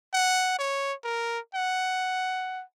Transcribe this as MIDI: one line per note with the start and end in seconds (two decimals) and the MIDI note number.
0.13 0.55 78
0.59 0.93 73
1.04 1.39 70
1.54 2.64 78